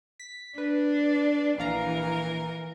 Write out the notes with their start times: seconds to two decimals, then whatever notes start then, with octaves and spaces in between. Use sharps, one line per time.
0.20 B6
0.58 D4 B4
1.58 A#1 E3 A#4 F5 A#5